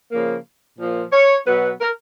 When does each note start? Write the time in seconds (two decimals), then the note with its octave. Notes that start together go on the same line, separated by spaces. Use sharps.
0.12 C#3 F3 A#3
0.79 A#2 F3 A#3
1.12 C#5
1.46 B2 F#3 B3 B4
1.80 A#4